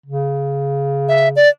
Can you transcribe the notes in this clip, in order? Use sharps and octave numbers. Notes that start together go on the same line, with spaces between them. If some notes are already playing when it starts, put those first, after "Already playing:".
C#3
E5
D5